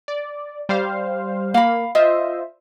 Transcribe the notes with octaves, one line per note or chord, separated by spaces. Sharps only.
D5
G3 C5 F5
A#3 F5 B5
F4 C5 D#5 E5